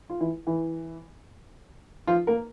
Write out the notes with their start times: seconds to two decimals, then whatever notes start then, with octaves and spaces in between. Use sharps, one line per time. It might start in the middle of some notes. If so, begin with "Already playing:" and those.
0.10 F4
0.20 E3 E4
0.47 E3 E4
2.07 F3 F4
2.27 A#3 A#4